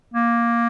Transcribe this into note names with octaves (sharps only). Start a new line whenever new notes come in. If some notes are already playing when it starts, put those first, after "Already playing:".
A#3